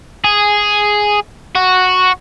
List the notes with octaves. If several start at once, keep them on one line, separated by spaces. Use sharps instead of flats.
G#4
F#4